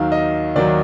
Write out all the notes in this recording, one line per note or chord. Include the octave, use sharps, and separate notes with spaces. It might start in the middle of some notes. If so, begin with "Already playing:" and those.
Already playing: D#2 D#3 F#3 F5
D#5
D#2 D#3 F#3 D5